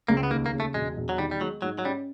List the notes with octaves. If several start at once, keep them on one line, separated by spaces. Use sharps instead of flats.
C#2 A#3
C4
B3
D#2 A#3
A#3
C#3
A3
E1 G#3
E1
F#3
D#3 G3
G3
F#3 G#3
G#2 F#3
F#3
G3 C#4